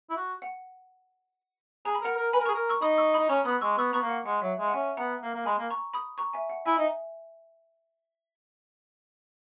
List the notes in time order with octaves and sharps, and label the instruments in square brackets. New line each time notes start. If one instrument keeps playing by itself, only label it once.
[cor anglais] E4
F#4
[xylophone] F#5
[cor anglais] G#4 [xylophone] A#5
[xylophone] B5
[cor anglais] A#4 [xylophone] F#5 A#5
[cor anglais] A#4
[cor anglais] B4 [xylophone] G#5 B5
[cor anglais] A#4
[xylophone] A#5 C#6
[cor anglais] G#4
A#4
[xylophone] C#6 E6
[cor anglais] D#4 [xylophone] B5 D#6
[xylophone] C#6 E6
B5 D#6
[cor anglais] D#4
[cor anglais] C#4 [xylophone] A#5 C#6
[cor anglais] B3 [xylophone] B5 D#6
[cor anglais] G#3 [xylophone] C#6 E6
[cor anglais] B3 [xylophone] C#6 E6
[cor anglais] B3 [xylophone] A#5 C#6
[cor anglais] A#3
[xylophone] F#5
[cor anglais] G#3 [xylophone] F#5
[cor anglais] F#3 [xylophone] E5
[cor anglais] G#3
[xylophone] F#5
[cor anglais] C#4 [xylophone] E5 G#5
[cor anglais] B3 [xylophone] F#5 A#5
[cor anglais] A#3
A#3
[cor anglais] G#3 [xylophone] G#5 B5
[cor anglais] A#3
[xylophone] A#5 C#6
B5 D#6
A#5 C#6
E5 G#5
F#5
[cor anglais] E4 [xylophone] E5 G#5
[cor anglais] D#4 [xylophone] E5